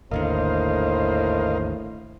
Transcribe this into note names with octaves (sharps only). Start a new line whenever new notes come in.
G#1 D#2 A2 D3 A#4 C5 D#5 F5